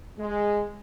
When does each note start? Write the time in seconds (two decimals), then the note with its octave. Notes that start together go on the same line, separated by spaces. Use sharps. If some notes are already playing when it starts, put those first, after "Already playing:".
0.19 G#3